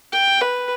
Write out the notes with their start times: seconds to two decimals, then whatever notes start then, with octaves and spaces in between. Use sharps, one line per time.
0.13 G5
0.41 B4